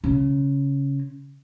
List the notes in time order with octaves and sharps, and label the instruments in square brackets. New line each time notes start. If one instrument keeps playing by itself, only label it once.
[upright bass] C#3